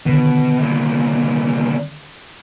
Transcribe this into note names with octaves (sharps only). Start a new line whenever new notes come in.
B2 D3 D#3
C2 A#2